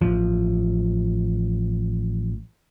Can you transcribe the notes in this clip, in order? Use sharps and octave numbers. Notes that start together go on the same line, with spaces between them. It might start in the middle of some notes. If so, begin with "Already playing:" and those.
A1 F3